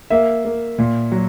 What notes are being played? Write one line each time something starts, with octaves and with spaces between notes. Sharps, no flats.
A#3 E5
A#3
A#2
F#3